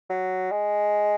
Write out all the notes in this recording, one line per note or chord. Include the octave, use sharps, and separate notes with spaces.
F#3
G#3